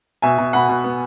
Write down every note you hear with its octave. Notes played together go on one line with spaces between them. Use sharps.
B2 E5 G#5
B2
B2 F#5 B5
B2
B3